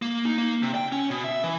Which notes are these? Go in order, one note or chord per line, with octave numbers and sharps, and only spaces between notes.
A#3
D#4
A#3
C3
G5
C#4
B2
E5
E3